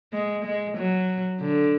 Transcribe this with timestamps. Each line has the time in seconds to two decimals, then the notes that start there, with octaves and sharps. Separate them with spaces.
0.13 G#3
0.45 G#3
0.78 F#3
1.41 D3